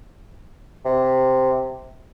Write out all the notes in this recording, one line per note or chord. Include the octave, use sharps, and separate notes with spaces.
C3